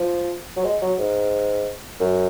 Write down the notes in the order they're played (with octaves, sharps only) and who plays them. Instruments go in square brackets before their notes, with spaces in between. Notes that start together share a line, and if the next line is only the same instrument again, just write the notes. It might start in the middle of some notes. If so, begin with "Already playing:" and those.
Already playing: [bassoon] F3
F#3
G#3
F#3
G#2
F#2